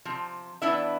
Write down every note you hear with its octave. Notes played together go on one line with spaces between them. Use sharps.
C3 F3
E3 B3 D4 E4 E5